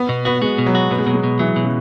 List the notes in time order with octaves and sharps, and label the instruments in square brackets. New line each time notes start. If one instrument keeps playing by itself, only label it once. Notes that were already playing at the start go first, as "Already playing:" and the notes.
Already playing: [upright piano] B3
[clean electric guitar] B2
[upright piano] B3 [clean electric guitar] F#4
[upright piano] G#3 [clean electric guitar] F#4
[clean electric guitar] B2
[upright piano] F#3
[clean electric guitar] F#4
[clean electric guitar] B2 [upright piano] B3
[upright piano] G#3
[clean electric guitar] B2 [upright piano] F#3
[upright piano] G#3
[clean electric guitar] B2
[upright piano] E3 [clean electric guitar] F#3
[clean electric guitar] B2
[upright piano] C#3